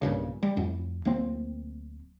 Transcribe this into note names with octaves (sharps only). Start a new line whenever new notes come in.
B1 G2 A#2 C#3
G3
F2 A2
D1 A#3 C4